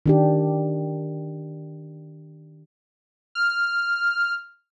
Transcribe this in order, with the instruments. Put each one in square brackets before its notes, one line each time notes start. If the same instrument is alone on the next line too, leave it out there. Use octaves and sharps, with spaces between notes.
[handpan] D#3 D4 G4
[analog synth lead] F6